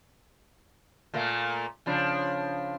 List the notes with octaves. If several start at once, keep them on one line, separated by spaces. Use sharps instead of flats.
A#2 A3 A#3
C#3 F3 D4